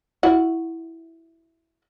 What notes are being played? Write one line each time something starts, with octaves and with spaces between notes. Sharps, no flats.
E4 F#4